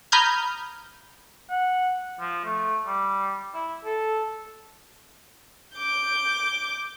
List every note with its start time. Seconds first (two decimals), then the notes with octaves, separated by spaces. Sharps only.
0.12 A#5 B5 D#6 F6 G6 G#6
1.50 F#5
2.20 F3
2.45 A3
2.86 G3
3.54 E4
3.85 A4
5.77 D6 G6